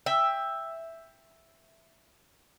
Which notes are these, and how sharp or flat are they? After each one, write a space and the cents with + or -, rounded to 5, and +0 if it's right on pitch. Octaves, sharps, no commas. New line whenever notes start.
E5 +0 G5 +15